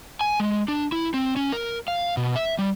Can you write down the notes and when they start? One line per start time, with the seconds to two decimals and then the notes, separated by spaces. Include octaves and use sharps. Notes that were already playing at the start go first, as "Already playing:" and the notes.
0.21 G#5
0.40 G#3
0.68 D4
0.92 E4
1.14 C4
1.36 C#4
1.52 A#4
1.88 F5
2.17 B2
2.36 E5
2.58 G3